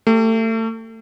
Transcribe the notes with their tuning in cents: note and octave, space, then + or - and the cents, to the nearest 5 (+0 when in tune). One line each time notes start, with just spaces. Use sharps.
A3 +30 G4 +15